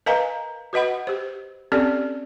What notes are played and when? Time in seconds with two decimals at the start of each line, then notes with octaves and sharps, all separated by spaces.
0.06 A#4 B4 D#5 F5 G#5 A#5
0.73 F#4 B4 D#5 F#5 B5
1.07 G4 C5
1.72 C4 C#4 G4 A4 D5